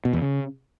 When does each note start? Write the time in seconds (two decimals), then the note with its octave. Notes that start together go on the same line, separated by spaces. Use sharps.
0.05 B2
0.13 E2
0.22 C#3